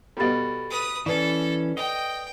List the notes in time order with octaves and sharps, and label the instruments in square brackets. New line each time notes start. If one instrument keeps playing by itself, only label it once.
[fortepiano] B2 G3 [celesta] A4 B5 A6
[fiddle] B4 D#6
[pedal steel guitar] E3 C#4 [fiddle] A4 [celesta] B4 D5
[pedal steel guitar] D#5 [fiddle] G5